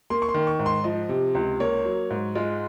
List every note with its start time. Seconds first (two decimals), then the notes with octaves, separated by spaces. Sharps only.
0.10 A#3 C6
0.22 C#6
0.29 C6
0.34 D#3
0.47 C#6
0.59 G#2
0.66 C6
0.84 F3 D#5
1.09 C3
1.35 C#2
1.60 A#3 C#5
1.85 F#3
2.10 G#2
2.35 G#3 F4